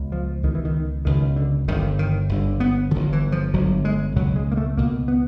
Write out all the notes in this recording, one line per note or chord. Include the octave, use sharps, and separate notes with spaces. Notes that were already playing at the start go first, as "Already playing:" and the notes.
Already playing: C#2 B2
F3
C#2 B2 D#3
E3
D#3
C#2 B2 D#3
D3
G1 G2 D3 D#3
D#3
G1 G2 D3
B3
G1 G2 D3 F3
E3
F3
G1 G2 D3 F#3
G#3
C#2 B2 F#3
G#3
A#3
A3
C#2 B2 A#3
B3